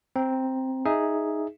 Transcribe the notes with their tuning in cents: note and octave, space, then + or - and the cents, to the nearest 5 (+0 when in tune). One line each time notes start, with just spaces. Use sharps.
C4 +0 A#5 +10
D#4 +0 G#4 +0 E5 +0